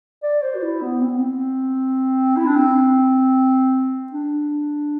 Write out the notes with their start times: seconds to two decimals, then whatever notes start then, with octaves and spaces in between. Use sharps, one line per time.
0.23 D5
0.42 C5
0.55 F#4
0.62 E4
0.82 B3
1.01 C4
1.09 B3
1.18 C4
2.37 E4
2.46 D4
2.56 C4
4.12 D4